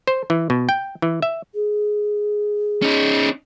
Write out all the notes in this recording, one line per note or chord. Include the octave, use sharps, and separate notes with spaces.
C5
E3
B2
G5
E3
E5
G#4
C#4 D#4